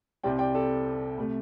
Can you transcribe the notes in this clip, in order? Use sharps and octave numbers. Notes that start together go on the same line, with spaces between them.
C2 C3 G3 C4 D5 G5
D5 G5
A4 D5
C3 A3